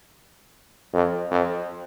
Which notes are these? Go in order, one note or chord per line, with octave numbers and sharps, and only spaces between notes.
F2
F2